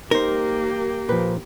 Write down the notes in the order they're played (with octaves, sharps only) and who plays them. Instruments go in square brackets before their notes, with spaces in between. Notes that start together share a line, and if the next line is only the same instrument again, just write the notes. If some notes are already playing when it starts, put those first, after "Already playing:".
[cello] A#3 G4 [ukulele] D#4 C5 [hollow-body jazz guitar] A#4
[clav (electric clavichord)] A#2 F3 [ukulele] B4